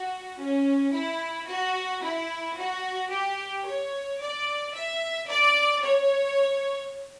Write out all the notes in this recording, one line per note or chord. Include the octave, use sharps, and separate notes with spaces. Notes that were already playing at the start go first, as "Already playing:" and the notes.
Already playing: F#4
C#4
E4
F#4
E4
F#4
G4
C#5
D5
E5
D5
C#5